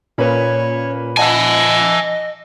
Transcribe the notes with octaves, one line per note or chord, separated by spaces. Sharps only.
A#2 A#3 C#4 B4 C#5 B5
D#5 E5 F#5 G#5 A5